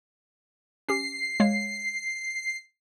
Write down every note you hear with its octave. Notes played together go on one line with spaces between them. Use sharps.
C#4 G4 C7
G#3 C#5 F5